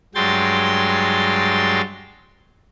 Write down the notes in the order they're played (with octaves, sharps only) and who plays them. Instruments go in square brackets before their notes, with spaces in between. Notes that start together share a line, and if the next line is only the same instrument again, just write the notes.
[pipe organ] G2 F#3 G#3 G5 C6 A6